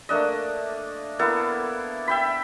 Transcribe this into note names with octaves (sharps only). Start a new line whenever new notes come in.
A3 A#3 D4 D#5
A#3 B3 E4 A4
E5 G5 B5